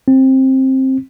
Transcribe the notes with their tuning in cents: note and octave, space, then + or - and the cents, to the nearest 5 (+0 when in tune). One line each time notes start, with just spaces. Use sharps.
C4 +15